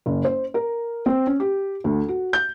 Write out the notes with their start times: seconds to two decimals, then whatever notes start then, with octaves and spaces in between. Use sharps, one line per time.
0.06 F#1
0.25 C5
0.54 A#4
1.06 C4
1.27 C#4
1.40 G4
1.84 D2
2.08 F#4
2.33 G6